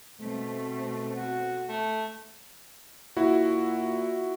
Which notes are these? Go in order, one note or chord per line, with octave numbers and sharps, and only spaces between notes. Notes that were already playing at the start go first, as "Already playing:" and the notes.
B2 A3 C4
F#4
A3
A#2 E4 F#4